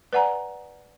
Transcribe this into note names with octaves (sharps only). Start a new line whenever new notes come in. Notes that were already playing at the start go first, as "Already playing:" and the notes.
B4 D5 F#5 G#5 A#5